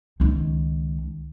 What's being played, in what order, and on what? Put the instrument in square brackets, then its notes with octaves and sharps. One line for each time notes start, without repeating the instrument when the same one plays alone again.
[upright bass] C#2 D#3